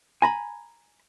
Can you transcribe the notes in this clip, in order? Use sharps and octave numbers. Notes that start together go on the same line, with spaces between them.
G#5 A#5 B5